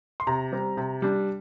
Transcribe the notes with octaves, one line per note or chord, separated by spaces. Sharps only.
C6
C3 A#5
G3 C4
C3
G3 D4